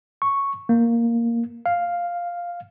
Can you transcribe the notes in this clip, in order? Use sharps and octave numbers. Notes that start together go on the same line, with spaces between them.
C#6
A#3
F5